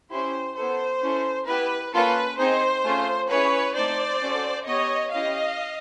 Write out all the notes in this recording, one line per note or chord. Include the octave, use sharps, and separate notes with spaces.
C#4 E4 G4 C5
B3 E4 A4 C5
C#4 E4 A4
B3 E4 G4 B4
A#3 C#4 F4 A4 B4
C4 D#4 G#4 C5
A3 C#4 F4 G#4
C#4 E4 G#4 B4 C#5
A3 C4 D#4 C5 D5
C#4 F#4 A4
B3 D#4 G4 C#5 D#5
C#4 E4 G4 D#5 F5